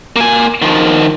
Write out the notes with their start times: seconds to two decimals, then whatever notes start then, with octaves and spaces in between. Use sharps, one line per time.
0.16 A#3 G#5
0.62 D#3 F3